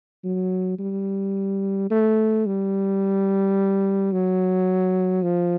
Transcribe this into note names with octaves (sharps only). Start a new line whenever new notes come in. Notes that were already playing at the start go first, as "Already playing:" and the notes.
F#3
G3
A3
G3
F#3
F3